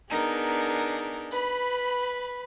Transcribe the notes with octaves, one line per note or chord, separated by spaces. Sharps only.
B3 D4 D#4 G#4 A#4
B4 B5